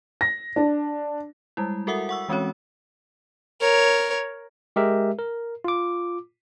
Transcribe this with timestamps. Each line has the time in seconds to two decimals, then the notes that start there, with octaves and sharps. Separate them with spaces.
0.21 A#6
0.56 D4
1.57 G3 G#3 E4
1.87 F#4 A4 A#4 E5 F#5 D#6
2.09 F#5 C#6 E6
2.29 E3 G#3 C4 C#4 F#4 C#5
3.61 A#4 C#5
4.76 G#3 G4 A#4 E5
5.19 A#4
5.64 F4 D6